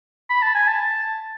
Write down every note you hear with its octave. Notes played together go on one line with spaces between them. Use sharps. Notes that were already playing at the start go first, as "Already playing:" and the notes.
B5
A5
G#5
A5